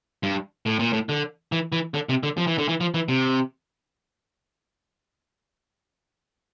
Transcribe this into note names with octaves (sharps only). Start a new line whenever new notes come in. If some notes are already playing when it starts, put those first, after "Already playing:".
G2
A2
A#2
A2
D3
E3
E3
D3
C3
D3
F3
E3
D3
E3
F3
E3
C3